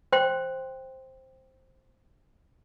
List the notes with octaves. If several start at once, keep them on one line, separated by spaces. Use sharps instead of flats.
C5 G5 C6